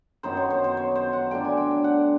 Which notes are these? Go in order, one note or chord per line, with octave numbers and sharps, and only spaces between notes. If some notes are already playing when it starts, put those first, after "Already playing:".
F#2 D#3 F#3 B3 C5
C#5
C5
C5
C#5
C5
F#5
D3 F#3 A3 D4 G5
G#5
G5
G5
F#5